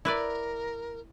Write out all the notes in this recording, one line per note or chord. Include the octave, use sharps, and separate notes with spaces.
E4 A#4 B4 D5